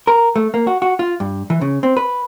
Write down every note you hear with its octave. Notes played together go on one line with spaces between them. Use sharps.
A#4
A3
A#3
F#4
F#4
F4
G2
E3
C#3
C4
B4